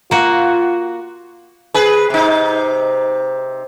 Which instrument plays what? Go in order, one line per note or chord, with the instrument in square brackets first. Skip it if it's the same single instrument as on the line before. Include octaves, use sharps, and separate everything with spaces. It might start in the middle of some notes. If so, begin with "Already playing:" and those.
[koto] A#3 F#4 [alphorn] F4
[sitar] G#4 B4
C3 D#4